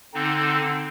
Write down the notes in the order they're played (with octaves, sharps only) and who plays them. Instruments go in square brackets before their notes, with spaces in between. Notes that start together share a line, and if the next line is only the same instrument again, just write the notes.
[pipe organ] D3 C4 D#4